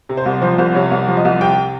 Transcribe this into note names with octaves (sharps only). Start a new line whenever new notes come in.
C3
C5
C2
F3 C5
C2 C5
C3 C#5
C2
F3
D#5
C2
C3 G5